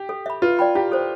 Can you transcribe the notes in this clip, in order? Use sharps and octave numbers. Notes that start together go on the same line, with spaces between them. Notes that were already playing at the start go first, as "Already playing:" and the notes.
Already playing: G4
A4
E5 B5
F4 B4
D5 G5 B5
E4 G4
A4 C5